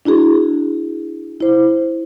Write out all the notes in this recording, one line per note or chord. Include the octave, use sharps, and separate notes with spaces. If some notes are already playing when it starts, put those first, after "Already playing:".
D4 E4 F#4 G#4
E4 C5